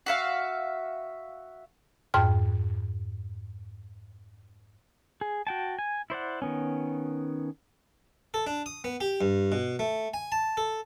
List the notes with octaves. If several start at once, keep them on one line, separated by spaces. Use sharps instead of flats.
F#4 E5 F5
F2 G#2 G5 F6
G#4
F#4 G5 A5
G#5
E4 C5 D5 F#5
D#3 B3 C#4
A4
D4
D#6
B3
G4
G2
B2
A3
G#5
A5
A4